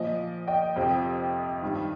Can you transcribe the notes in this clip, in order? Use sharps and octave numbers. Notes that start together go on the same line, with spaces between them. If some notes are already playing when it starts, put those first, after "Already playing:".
Already playing: A#2 F3 D#5
D#5 G5
F2 C3 F3
G2 D#3